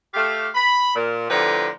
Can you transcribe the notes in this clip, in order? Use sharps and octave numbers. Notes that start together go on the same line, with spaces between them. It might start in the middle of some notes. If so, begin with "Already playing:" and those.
A3 G4 F5
B5
A#2
A2 D3 F3 G4 B4 A#5